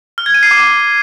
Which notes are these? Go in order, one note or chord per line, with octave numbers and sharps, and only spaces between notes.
F6
G#6
D#7
C7
D6